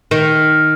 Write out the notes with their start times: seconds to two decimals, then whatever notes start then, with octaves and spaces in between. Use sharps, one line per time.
0.11 D#3